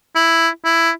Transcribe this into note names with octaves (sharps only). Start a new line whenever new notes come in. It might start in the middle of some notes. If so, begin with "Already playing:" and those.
E4
E4